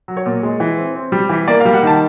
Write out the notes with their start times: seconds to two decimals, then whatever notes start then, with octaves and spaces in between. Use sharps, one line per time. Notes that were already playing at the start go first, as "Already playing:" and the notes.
0.08 F#3
0.17 C#5
0.26 A#2
0.43 G#3
0.60 E3
0.77 C4
0.95 C4
1.12 G3
1.29 E3
1.48 A#3 D5
1.60 F5
1.65 G3
1.74 F#5
1.83 D#3 A5